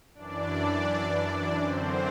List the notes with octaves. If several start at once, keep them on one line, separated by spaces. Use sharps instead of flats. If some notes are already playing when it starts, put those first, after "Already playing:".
F#2 E3 D4 D5
F#2 D3 C4 C5